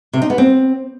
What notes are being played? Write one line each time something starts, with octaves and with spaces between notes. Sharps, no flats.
C3
D#4
B3
C4